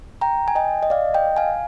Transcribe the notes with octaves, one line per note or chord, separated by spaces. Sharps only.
G5 A#5
G#5
D#5 G5
D#5
D5 F5
D#5 G5
F5 G#5